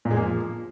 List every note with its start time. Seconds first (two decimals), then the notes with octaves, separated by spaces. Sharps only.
0.05 A#2
0.11 G#3
0.16 A#3
0.22 F3